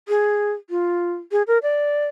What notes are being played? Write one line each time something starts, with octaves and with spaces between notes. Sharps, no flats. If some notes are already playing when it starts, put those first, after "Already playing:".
G#4
F4
G#4
A#4
D5